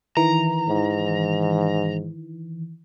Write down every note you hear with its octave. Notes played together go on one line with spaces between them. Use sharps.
D#3 E3 A#5
G#2